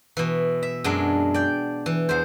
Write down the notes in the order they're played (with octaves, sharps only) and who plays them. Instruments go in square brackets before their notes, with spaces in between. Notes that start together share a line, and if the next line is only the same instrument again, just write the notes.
[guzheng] B2 E3
E5
F#2 G#3 D4
D5 G5
E3
E2 C5